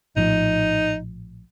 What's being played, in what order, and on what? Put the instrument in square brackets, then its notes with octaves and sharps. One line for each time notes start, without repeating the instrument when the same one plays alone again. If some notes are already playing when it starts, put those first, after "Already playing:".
[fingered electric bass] A#1 A2 F3 [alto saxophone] D#4